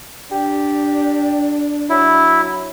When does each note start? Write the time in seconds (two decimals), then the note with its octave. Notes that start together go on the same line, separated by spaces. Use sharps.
0.31 D4 G4
1.90 F#3 E4